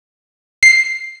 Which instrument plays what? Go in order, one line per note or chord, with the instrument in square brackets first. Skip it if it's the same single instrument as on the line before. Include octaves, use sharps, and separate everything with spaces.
[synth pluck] C7